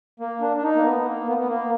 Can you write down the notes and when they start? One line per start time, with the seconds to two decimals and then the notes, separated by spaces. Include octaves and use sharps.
0.20 A#3
0.41 D4
0.56 D4
0.63 D#4
0.75 A#3
0.84 B3
1.05 A#3
1.27 B3
1.38 B3
1.48 A#3